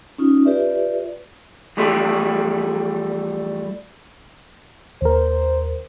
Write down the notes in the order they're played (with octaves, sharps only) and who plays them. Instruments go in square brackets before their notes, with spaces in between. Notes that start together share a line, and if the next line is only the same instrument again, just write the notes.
[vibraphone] C#4 D#4 F4
F4 G4 B4 D5 E5
[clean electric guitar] E3 F3 G3 A3 E4 G4
[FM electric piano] D#2 A#4 [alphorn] C5